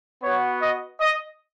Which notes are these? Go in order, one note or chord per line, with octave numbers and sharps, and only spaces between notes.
B3 F#4 C#5
D#5
D#5